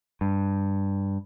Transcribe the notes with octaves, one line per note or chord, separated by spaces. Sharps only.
G2